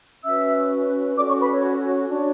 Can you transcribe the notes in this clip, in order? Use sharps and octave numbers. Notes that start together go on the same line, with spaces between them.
C#4 F#4 B4 E5 E6
C#4 F#4 A4 C#5 D5 D6
C#5 C#6
B4 B5
C#5
D4 F#4 C#5